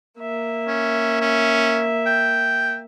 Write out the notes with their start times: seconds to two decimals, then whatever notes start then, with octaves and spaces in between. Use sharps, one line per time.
0.19 A#3 E5
0.67 C#4
1.21 C#4
2.06 G5